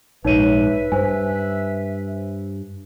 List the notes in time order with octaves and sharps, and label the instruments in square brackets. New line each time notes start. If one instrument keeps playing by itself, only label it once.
[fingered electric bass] A#1 G#2 [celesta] D#4 C#5 D#7 [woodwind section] B4 E5
[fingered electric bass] G2 [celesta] C5 G#5